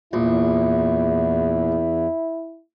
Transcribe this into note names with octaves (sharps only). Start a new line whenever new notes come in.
A#1 E2 E4